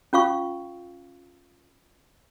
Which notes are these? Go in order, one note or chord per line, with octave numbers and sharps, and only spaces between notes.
C#4 F4 F5 C#6